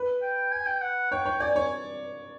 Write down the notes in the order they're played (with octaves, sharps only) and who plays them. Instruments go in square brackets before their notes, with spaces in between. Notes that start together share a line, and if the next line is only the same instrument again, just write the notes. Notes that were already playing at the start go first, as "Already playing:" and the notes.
Already playing: [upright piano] B4
[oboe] G5
G#5
G5
F#5
[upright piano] C#5 [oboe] G5
[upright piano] C#5
[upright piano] D5 [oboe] G#5
[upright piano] C#5